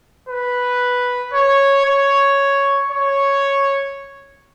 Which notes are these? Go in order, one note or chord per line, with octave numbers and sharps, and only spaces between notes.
B4
C#5
C#5
C#5